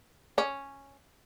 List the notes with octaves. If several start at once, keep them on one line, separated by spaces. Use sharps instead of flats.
C#4